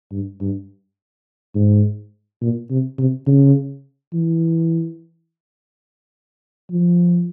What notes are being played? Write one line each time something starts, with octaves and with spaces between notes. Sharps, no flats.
G2
G2
G#2
A#2
C3
C3
C#3
E3
F3